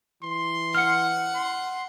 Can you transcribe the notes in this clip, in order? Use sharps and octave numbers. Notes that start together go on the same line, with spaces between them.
E3 C6
F#5 F6 C#7
C6